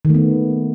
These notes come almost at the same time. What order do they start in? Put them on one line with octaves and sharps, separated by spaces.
D#3 A3 B3